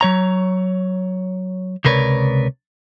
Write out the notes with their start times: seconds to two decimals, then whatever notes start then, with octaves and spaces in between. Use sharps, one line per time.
0.01 F#3 C#5 A#5
1.85 C#2 C3 A#4 B4 C#5 D5